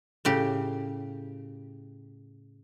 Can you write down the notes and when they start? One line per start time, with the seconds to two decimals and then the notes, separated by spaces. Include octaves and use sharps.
0.25 A2 C#3 G4